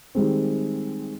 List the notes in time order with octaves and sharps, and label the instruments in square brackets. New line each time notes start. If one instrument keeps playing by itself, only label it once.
[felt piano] D#3 G3 G#3 C4